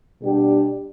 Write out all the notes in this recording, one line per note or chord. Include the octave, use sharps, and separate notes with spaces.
B2 G3 D4 G4